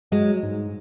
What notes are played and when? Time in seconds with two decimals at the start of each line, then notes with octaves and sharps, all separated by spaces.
0.12 F#3 G#3
0.43 G#2